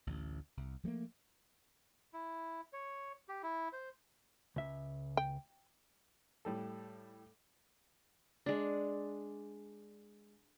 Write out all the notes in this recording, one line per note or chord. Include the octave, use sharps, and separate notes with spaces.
A1 D2
C2
F3 G3 A3 A#3
E4
C#5
G4
E4
C5
C#2 E5
G5
A2 G3 A4
G#3 D4